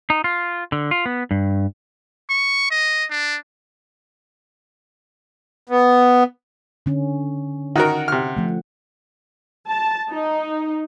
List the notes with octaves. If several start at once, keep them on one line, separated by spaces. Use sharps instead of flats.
D#4
F4
D3
F4
B3
G2
C#6
D#5
D4
B3
D3 C#4
D#3 F#4 A#4 F#5
C3 F6
F3 A3
A5
D#4